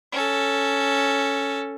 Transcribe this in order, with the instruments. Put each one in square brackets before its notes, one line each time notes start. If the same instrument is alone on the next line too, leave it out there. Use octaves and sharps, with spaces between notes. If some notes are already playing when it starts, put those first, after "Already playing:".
[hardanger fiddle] C#4 A4